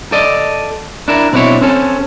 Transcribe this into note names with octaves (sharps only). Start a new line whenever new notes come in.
A4 D5 D#5
D4 E4 A#4
B2 C4 D4 E4 C#5
C4 C#4 A4